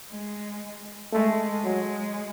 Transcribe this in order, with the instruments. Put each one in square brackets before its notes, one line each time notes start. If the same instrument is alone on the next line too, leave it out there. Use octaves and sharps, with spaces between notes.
[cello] G#3
[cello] G#3 [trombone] A3
[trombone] F#3 [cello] G#3